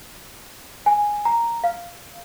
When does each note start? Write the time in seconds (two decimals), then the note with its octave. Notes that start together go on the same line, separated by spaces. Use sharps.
0.86 G#5
1.25 A#5
1.64 F5